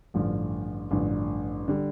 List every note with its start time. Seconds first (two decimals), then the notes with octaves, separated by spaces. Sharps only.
0.14 A1 G2 D3 F3
0.91 A1 G2 D3 F3
1.68 D3 G3